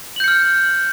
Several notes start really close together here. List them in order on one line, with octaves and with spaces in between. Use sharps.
F#7 G6 C#7 F6